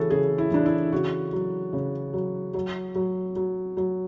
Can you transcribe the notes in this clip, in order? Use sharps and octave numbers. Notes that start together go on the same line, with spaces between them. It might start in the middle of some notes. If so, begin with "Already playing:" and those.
Already playing: C#3 E3 F#4 G#4 A4
C#3 G#4
E4
E3 D4
E4
C#3 F#4
F#3
C#3
F#3
F#3
F#3
F#3
F#3